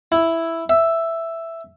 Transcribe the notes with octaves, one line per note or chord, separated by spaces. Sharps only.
E4
E5